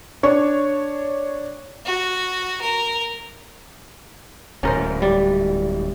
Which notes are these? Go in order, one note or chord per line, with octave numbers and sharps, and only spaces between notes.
D4 C#5 C#6
F#4
A#4
D1 G#2 C#4 A#4 C5
G3 D5